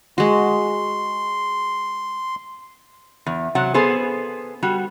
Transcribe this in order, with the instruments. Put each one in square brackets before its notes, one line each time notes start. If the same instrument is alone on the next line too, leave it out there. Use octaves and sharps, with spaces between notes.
[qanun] G#3 F#4 [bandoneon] C6
[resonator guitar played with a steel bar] E2
C3 F#3 F#5
B3 G#4 A4 C5
G3 F#4